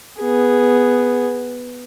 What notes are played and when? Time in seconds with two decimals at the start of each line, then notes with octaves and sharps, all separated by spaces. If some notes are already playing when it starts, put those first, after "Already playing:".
0.20 B3 G#4